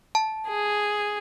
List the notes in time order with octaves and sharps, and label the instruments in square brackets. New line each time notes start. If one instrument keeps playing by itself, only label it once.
[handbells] A5
[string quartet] G#4